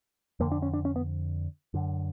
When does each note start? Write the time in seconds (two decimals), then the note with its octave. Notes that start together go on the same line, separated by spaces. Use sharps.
0.40 F2 D3 A#3
0.52 D4
0.62 C#4
0.74 D4
0.85 C#4
0.96 B3
1.74 F#2 D3